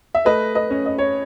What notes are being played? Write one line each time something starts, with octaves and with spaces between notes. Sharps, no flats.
E5
A3 B4 D#5
B4 D#5
C#4
D#5
C#5